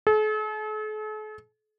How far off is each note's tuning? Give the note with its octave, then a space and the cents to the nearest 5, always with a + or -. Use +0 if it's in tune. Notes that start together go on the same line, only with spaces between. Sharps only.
A4 -45